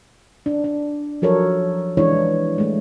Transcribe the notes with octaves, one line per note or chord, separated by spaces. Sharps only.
D4
D4
F3 F#3 A4 A#4 C#5
E3 G#3 D4 E4 C#5
G#3 A3